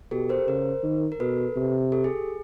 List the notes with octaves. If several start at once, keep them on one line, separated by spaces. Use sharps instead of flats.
B2 G4 A4
A#4 C5
C#3 A#4 C5
D#3
A#4
B2 A4 B4
C3
G4 A4
G#4